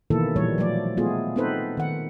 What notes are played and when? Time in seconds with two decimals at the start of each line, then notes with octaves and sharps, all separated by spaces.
0.10 B2 D#3 E3 A#3 E4 A4
0.36 A#2 E3 F3 G3 C#5
0.58 F3 F#3 A3 D5
0.97 G#3 A3 B3 F4 G#4
1.36 B3 C4 D#4 A4 B4 C5
1.77 D#3 F#5